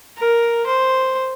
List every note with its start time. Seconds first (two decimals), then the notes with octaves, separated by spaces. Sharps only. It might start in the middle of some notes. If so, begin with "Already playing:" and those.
0.17 A#4
0.66 C5